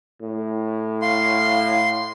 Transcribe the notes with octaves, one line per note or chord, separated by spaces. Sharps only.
A2
F5 C6